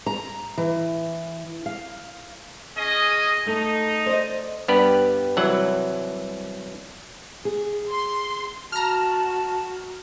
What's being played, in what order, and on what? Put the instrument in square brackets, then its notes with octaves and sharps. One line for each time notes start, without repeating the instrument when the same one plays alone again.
[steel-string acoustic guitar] A#5
E3
F5
[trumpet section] C#4 G#4 D#5
[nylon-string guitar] A3 A4 [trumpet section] D#4
[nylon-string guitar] C5 D5 D#5
[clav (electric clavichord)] G2 B3 G4 B4 D5
C2 E3 F#3 F#5
[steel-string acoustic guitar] G#4
[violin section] C6
[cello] F#4 [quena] A5 [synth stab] A#5 F6